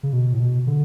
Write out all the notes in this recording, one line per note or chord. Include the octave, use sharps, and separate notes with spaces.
C#3
B2
A2
B2
D3